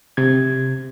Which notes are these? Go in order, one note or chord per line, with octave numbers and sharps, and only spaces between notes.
C3 G#6